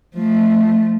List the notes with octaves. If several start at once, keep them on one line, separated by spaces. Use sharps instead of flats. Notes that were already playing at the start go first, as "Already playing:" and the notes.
F3 A3